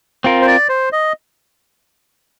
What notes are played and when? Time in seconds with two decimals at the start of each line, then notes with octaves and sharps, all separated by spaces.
0.24 C4 F4 A#4
0.42 C5
0.47 D5
0.69 C5
0.92 D#5